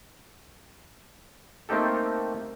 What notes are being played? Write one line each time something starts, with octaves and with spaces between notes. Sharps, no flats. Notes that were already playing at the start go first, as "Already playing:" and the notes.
A3 A#3 C4 D#4 G4 A4